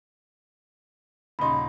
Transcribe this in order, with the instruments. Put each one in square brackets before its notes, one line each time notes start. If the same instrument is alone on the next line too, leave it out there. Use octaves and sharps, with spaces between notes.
[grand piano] D#1 C#3 D#4 [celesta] B5 C6